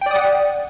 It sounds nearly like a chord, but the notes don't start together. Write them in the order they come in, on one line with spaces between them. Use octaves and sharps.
G5 D5 D#6 F#5